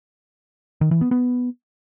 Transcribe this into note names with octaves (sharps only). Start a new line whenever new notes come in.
D#3
E3
B3
B3